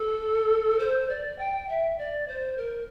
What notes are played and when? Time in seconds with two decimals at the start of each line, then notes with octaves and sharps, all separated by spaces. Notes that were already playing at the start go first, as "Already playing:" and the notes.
Already playing: A4
0.79 C5
1.09 D5
1.38 G5
1.69 E5
1.98 D5
2.28 C5
2.57 A#4